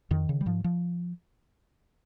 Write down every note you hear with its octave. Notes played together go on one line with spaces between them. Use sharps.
F2 D#3
C#3
G3
G#2 F3
F3